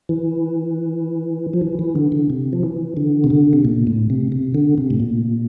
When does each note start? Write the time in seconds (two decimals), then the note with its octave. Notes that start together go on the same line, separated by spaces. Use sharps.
0.09 E3
1.53 F3
1.61 E3
1.79 E3
1.96 D3
2.12 D3
2.30 C3
2.53 F3
2.63 E3
2.97 D3
3.24 C3
3.30 D3
3.53 C3
3.65 A#2
3.87 A2
4.10 C3
4.32 C3
4.54 D3
4.78 C3
4.90 A2
5.00 A#2